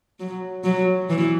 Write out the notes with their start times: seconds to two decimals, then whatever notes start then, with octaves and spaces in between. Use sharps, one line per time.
0.19 F#3
0.64 F#3
1.10 E3